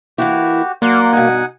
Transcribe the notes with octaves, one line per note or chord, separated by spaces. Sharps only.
E3 A#3 E4 F#4 G4
F#3 A#3 D5 F#5 C6
G2 B2 D#4 F#5 G#5